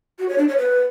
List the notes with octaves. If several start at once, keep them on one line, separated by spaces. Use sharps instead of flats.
F#4
C#5
D4
C#5
B4